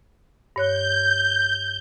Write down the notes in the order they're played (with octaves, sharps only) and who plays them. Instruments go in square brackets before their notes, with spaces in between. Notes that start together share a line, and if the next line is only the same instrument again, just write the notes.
[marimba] G2 C#5 F#6 [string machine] G6